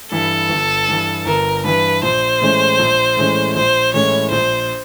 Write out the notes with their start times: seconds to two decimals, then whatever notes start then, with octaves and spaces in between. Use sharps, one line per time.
0.12 G2 E3 A4
0.49 G1
0.89 G2 E3
1.26 G1 A#4
1.64 G2 E3 B4
2.02 A#1 C5
2.42 A2 E3 G#3 C#4
2.79 A#1
3.17 A2 E3 G#3 C#4
3.55 A#1 C5
3.94 A2 E3 G#3 C#4 C#5
4.31 A#1 C5